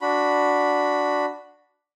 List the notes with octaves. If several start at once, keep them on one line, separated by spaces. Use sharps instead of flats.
D4 F#4 B5